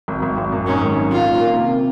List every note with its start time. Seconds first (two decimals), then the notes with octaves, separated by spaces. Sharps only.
0.08 G#1
0.22 G#1
0.37 G#1
0.52 F#2
0.67 G#2 C#4
0.82 D#3
0.96 G#1
1.12 D#3 F4
1.27 A#3
1.41 A#3
1.56 C3